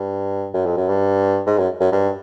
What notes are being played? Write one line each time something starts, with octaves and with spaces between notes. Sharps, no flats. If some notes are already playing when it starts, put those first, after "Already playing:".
Already playing: G2
F#2
F2
F#2
G2
G#2
F#2
F#2
G2